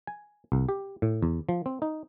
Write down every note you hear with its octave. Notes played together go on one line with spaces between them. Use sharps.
G#5
C2
G4
A2
E2
F3
C4
D#4